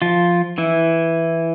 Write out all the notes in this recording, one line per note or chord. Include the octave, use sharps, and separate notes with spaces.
F3 F4
E3 E4